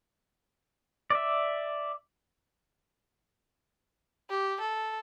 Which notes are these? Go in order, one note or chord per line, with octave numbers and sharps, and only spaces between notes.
D5 E5
G4
A4